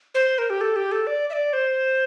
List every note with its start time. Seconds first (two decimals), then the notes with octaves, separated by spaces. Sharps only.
0.15 C5
0.38 A#4
0.50 G4
0.61 A4
0.76 G4
0.92 A4
1.07 D5
1.30 E5
1.33 D5
1.53 C5